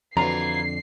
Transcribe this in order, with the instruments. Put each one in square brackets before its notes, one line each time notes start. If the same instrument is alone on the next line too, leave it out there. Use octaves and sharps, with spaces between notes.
[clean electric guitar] F2 D3 [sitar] E3 F#3 F4 [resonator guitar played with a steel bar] A#5 [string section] C7